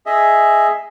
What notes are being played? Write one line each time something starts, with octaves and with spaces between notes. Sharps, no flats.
G#4 D#5 E5